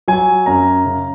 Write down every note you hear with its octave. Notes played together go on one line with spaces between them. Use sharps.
F#3 G#5
F#2 A#5
C#3